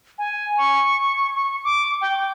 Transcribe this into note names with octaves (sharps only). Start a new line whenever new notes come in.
G#5
C#6
C#6
D6
G5